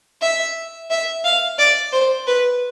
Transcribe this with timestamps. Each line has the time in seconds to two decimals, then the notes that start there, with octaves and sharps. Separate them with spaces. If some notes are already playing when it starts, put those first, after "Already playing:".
0.22 E5
0.90 E5
1.24 F5
1.58 D5
1.92 C5
2.27 B4